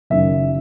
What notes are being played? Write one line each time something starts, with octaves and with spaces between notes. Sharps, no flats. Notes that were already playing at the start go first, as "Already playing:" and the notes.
F#1 F#2 D#3 E5